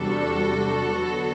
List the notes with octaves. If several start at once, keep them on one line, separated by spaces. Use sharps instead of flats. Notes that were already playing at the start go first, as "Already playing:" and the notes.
Already playing: E2 C3 G3 D4 F#4 A4
D3 F#3 B3